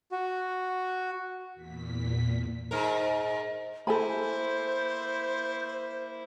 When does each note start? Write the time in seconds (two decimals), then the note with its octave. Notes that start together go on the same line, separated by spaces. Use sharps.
0.12 F#4
1.54 E2 A#2 B6
2.71 G#2 A#4
3.87 A#3 E4 A4 C5 G#5 B5